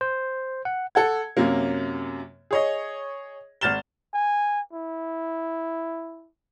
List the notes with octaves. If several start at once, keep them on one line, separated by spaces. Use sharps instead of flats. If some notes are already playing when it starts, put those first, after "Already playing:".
C5
F#5
A4 F#5 G#6
F#2 C3 F#3 A#3
G#4 C#5 D#5
G#1 F6 A6 E7 G7
G#5
E4